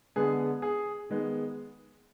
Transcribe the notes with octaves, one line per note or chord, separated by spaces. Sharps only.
D3 G#3 B3 G#4
G#4
D#3 G#3 B3